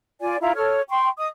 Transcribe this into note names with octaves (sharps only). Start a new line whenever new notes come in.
F4 D5 G#5
E4 F4 A#5
A4 C#5 F6
G5 C6 C#6
D#5 D#6